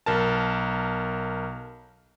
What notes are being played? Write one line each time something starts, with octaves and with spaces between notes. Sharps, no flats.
B1 A#4 A5